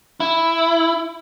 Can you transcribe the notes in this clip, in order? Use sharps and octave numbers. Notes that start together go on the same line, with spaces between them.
E4